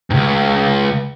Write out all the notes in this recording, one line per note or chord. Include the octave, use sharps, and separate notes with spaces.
C#2 G2